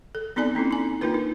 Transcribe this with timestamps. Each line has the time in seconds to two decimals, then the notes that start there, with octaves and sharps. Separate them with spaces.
0.15 A4
0.36 B3 C4 D#4 A4 D5 G#5
0.55 A#3 C4 C#4 E4
0.71 D#4 G#5
1.01 A#3 D4 D#4 F4 A#4 B4
1.14 D#4